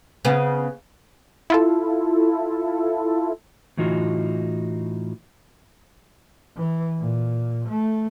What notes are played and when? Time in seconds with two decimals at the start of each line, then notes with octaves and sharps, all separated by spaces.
0.25 C#3 B3
1.50 E4 F4 A4
3.77 A2 E3 D#4 F4 F#4
6.57 E3
6.99 A#2
7.68 A3